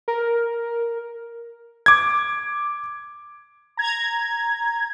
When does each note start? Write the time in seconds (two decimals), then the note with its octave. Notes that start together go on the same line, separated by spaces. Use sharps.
0.08 A#4
1.86 D6 G#6
3.77 A#5 G#6